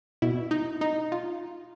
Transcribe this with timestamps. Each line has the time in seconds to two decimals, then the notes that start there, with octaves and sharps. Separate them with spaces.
0.22 B2 E4
0.51 D#4
0.81 D#4
1.12 F4